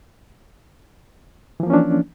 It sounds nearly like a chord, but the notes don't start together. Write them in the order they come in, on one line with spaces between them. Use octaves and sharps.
E3 F3 A#3 C#4 D4